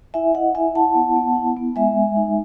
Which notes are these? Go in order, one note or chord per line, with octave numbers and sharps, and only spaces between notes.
E4 E5 G#5
E4 D#5 F#5
E4 E5 G#5
E4 F#5 A5
B3
B3
E4
B3
G#3 E5 G#5
G#3
D#4